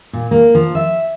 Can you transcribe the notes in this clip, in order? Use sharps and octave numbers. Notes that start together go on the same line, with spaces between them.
A#2
A#3
F3
E5